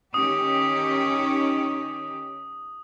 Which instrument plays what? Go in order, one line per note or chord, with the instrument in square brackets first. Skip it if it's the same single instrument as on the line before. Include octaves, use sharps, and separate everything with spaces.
[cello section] D#3 C#4 G4 [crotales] D#6